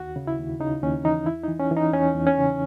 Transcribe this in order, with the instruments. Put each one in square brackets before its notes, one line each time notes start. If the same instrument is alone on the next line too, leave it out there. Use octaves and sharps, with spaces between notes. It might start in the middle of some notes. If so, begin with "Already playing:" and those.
Already playing: [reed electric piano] D#2 F#4
C#3
E4
D#2
C#3 D#4
D#2 C#4
E3 D#4
E2 E4
E3 D#4
C#4
E3
D#4
E2 C#4
E2
C#4
C#3